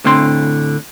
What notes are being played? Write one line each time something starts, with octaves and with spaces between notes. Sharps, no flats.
A2 D3 C4 C6